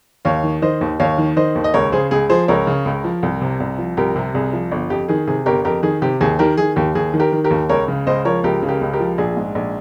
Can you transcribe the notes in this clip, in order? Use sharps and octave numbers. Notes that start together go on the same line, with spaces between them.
D#2 C#5 F5
D#3
D#3 C5 D#5
D#2
D#2 C#5 F5
D#3
D#3 C5 D#5
D#2
D#5
C#2 A#4 C#5
C#3 G#4 C5
C#2 G#4
F3 G#4 C5
C#2 A#4 C#5
C#3
C#2
F3
C2
C3
C2
F3
C2 G4 A#4
C3
C2 G#4
F3
G1
F2 G4
D#3 G#4
C3 G#4
G1 G4 A#4
F2 G4 A#4
D#3 G#4
C3 G4
D#2 G#4
D#3 G4 A#4
D#3 G#4
D#2 G4
D#2 G#4
D#3
G4 A#4
D#3
G4 A#4
D#2
C#2 A#4 C#5
C#3
C#2 C5 D#5
F3 A#4 C#5
C#2 G4 A#4
C#3
G4 A#4
C#2
G4 A#4
F3
A#1 G#4
G#2
A#1